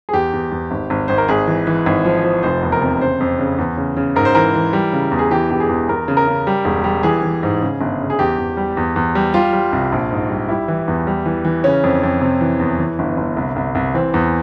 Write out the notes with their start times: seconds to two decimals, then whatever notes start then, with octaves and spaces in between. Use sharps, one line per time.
0.09 G#4
0.13 E2 G4
0.33 E2
0.51 E2
0.71 G#1
0.90 G#1
1.08 G#1 C5
1.18 A#4
1.28 G#1 G#4
1.47 E3
1.67 E3
1.86 G#1
2.05 F3
2.24 F3
2.43 F1 C5
2.62 E2
2.72 A#4
2.82 C3
3.00 C#3 C5
3.20 F2
3.39 C#3
3.58 E2
3.77 C#3
3.97 C#3
4.16 G#2 A#4
4.25 C5
4.35 E3 A#4
4.55 E3
4.73 G3
4.93 C#3
5.11 E2
5.19 G#4
5.31 E3 G4
5.50 E1 G4
5.60 G#4
5.69 E2
5.89 E2 A#4
6.08 C#3
6.17 A#4
6.27 C#3
6.47 G3
6.65 E1
6.84 G3
7.03 E3 G#4
7.23 E3
7.43 G#2
7.61 C#3
7.81 G1
8.00 C#3
8.10 G#4
8.19 E2 G4
8.38 E2
8.57 G3
8.77 E2
8.96 E2
9.15 G3
9.34 G3 F4
9.53 G3
9.72 C2
9.92 A#1
10.11 G#2
10.30 G3
10.49 G3 E4
10.68 E3
10.88 E2
11.07 G3
11.26 E3
11.45 E3
11.64 C#3 C#4
11.83 F2
12.03 F2
12.21 C3
12.41 E3
12.60 E2
12.79 E3
12.99 G1
13.17 G1
13.36 C2
13.56 C2
13.75 C2
13.94 E3 C4
14.14 E2